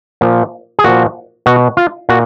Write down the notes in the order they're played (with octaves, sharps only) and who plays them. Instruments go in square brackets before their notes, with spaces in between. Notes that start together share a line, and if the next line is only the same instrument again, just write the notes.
[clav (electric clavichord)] A#2 F3
G#4
A#2 F3 F#4
B2 F#4
F4
A#2 F#4